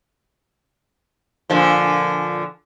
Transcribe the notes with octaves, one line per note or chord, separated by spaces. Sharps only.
A#2 D3 F3